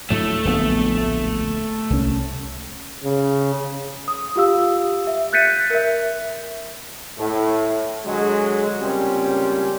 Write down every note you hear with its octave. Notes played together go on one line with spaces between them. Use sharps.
D2 A2 F#3 A3
D1 A#1 B3
C2 C#4
C#3
D#6
F4 G4 F5 E6
E5
F#6 G6 A6 B6 C#7 D#7
A#4 E5
A2
D3 F#3 G#3
C#2 G3 A#3 C4 C#4